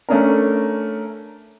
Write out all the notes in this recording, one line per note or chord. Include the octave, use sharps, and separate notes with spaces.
A3 C#4 D4 A#4